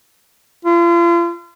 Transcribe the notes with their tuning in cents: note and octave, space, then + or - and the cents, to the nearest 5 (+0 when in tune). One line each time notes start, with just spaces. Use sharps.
F4 -40